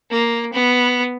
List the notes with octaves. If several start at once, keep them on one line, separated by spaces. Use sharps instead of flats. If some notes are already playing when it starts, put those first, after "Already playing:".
A#3
B3